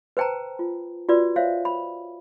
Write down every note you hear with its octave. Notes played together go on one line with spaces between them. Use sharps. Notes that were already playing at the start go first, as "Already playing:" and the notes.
B4 C5 G5 A5 A#5
F4
F4 F#4 B4 D5
C5 C#5 E5 F5
B5